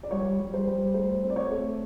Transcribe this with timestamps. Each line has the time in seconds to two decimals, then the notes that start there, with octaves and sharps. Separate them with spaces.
0.03 D5
0.11 G3 C#5
0.39 G3
0.54 C5
0.66 G3
0.94 A3 C5
1.23 C4
1.30 D5
1.36 C#5
1.51 A3